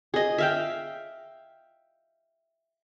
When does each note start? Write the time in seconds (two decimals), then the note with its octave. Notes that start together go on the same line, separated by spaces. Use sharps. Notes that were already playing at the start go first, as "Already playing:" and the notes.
0.14 G#4 D#5
0.38 E5 F5 G5